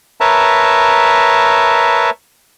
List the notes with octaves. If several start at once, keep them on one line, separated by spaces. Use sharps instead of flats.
A#4 B4 C#5 E5 A5 A#5